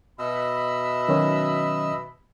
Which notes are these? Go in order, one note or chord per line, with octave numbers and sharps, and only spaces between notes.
B2 D#5 E5 B5 E6
D#3 F#3 C#4